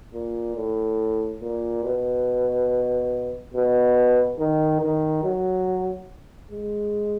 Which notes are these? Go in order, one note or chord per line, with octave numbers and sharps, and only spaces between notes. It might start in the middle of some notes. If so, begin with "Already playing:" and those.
A#2
A2
A#2
B2
B2
D#3
D#3
F#3
G#3